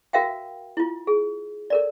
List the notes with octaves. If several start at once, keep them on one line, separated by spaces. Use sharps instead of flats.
F#4 A#4 E5 F5 G5
E4 F4
G#4
A4 A#4 D5